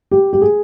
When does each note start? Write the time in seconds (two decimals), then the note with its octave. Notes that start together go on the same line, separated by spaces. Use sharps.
0.11 G4
0.33 G4
0.42 G#4